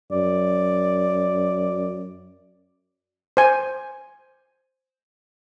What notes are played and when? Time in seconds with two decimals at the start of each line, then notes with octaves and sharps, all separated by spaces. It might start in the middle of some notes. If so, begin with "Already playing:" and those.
0.12 F#2 D5
3.37 C5 G#5